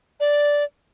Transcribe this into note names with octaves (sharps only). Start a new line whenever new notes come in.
D5